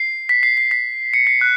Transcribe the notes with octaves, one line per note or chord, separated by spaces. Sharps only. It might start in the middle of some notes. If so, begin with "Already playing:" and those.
Already playing: C7
B6
C7
C7
B6
C#7
C7
F#6